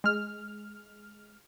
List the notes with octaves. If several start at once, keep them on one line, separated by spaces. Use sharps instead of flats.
G#3 F6